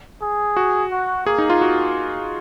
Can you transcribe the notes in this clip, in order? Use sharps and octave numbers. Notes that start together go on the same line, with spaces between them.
G#4
F#4
F#4
A#3 G#4
D#4
F4
F#4